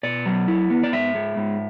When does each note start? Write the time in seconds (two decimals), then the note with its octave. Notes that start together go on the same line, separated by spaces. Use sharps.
0.03 B2 D5
0.26 F#3
0.48 E4
0.70 B3
0.83 D5
0.93 G#2 E5
1.15 G#3
1.37 G#2